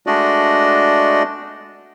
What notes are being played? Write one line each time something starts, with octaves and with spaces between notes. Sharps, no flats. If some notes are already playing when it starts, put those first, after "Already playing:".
G#3 A3 D4 F#4 D5 D#5